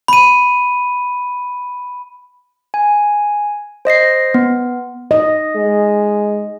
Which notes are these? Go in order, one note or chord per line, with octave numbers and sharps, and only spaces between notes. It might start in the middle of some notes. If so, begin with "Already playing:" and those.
B5 D#7
G#5
C5 D#5 A#6 C7
B3
D#5
G#3